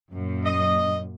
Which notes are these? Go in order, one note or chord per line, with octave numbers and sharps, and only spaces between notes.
F#2 A#2
D#5